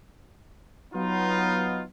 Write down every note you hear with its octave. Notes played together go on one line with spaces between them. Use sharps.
F#3 B3 D#4 F4